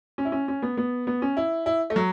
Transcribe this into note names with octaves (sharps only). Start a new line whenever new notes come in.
C#4
E4
C#4
C#4
B3
B3
B3
C#4
E4
E4
A3
F#3